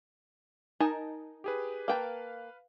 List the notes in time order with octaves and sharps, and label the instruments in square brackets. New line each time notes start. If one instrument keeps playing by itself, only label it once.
[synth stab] D#4 [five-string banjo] A#4 G#5 A5
[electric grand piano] G4 G#4 B4
[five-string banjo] A#3 G5 A5 [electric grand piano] B4 F5